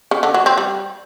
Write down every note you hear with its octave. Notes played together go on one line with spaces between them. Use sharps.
C#3
D3
F#3
C4
G3